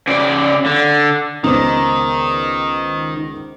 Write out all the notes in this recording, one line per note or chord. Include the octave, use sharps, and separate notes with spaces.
C#3 D5
D3
C#2 D#3 B3 D#4 C5 D5